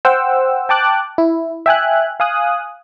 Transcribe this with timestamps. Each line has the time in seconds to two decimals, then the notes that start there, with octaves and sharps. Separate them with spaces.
0.05 C5 F#5 G5 E6
0.69 G5 A5 D6 F#6
1.18 E4
1.66 E5 G5 G#5 F#6
2.20 F5 G#5 D#6 F#6